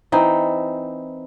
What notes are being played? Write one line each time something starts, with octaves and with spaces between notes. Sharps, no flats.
E3 C4 D#4